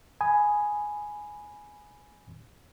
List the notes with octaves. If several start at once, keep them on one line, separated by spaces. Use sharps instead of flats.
G#5 B5 D#6